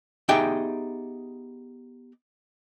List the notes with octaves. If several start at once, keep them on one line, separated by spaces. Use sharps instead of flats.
B3 D#4 G4 G#4 E5 G5